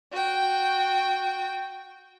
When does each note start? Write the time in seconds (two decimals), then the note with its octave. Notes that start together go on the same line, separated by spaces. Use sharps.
0.12 F#4 G5